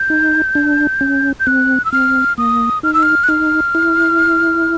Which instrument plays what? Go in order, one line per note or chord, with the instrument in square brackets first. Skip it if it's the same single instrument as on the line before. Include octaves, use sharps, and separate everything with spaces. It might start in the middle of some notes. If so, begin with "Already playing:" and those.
Already playing: [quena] G6
[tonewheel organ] D#4
D4
C#4
[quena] G6
[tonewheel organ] C4 [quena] F#6
[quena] E6
[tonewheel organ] C4 [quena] F6
[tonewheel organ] A#3 [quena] D#6
[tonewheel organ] D#4 [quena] F6
[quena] E6
F6
F#6
[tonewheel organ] D#4 [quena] F6
[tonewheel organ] E4